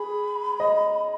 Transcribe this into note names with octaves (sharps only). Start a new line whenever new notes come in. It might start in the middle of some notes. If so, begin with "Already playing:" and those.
Already playing: G#4 B5
D#5